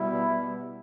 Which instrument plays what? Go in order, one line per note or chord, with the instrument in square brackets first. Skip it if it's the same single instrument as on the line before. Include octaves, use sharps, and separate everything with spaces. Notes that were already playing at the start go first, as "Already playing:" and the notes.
Already playing: [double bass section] B2 G3 B3 [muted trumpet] E4